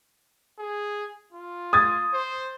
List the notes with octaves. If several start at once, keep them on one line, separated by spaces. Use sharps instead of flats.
G#4
F4
D#6 G#6 A6
C5